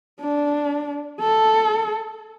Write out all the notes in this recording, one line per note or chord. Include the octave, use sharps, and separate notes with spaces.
D4
A4